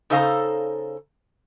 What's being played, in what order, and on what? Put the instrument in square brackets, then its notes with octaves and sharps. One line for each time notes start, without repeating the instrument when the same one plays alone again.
[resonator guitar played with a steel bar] C#3 D#4 A4 C5 F5 A#5